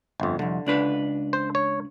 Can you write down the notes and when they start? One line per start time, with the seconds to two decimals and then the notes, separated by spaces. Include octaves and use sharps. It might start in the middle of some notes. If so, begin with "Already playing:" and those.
0.20 G1 F2
0.39 C2 F2 D3
0.67 C#2 D4 B4
1.33 C5
1.55 C#5